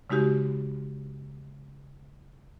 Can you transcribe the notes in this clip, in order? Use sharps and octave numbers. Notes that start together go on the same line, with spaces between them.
C#3 G#3 D#4 F#4 G4